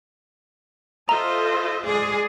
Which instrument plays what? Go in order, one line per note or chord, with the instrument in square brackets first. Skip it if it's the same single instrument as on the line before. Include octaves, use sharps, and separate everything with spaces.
[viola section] F4 A4 C5 [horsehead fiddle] D#5 E5 [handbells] A#5
[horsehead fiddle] G#3 D5 [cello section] G#4